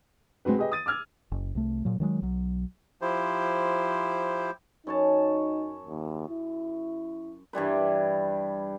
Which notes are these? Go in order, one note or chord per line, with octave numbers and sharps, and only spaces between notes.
G#3 C4 F#4 B4
G4 G#4 B4 D#5
D#6 A6 D#7
D6 E6 F6 G#6
F#1
C2 A3
A#2 F#3
D#3 F#3 G#3
B1 F#3
F3 E4 G4 C5
F#2 D#4 C#5 A5
D#2
E4
G2 E3 G3 B4